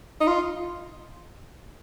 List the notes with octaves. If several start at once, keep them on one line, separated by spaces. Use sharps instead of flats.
D#4
F4